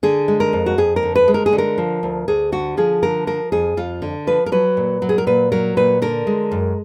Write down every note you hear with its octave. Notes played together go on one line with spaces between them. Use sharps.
D3 G#4
G#3
A#4
F2
F#4
F2 G#4
A#4
D3
B4
G#3
A#4
G#4
D3
A#4
F3
D2
D2 G#4
D3 F#4
F3 G#4
D3 A#4
F3 A#4
F2 G#4
F2 F4
D3
F3 B4
A#4
F#3 B4
A#2
F#3
G#4
A#4
A#2 B4
F#3 A#4
A#2 B4
D3 A#4
G#3
F#2